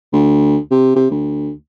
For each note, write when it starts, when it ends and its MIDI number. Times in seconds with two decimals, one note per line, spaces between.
0.13 0.58 38
0.71 0.94 48
0.95 1.07 48
1.11 1.51 38